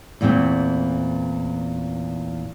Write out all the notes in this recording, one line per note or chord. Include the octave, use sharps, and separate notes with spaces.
E2 A#2 E3 A3 C4